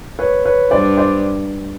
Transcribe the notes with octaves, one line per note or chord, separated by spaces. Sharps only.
B4 C#5
B4 C#5
G2 C5 D5
C5 D5